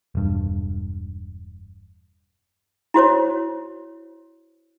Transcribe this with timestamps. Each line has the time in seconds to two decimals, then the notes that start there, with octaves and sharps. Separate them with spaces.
0.15 E1 G2
2.94 E4 F#4 C5 C#5